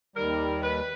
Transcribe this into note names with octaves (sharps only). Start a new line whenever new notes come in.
D#2 D#3 G3 A#4
B4